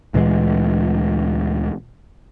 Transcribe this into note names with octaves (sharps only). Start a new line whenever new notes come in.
D2 A#2 E3 G#3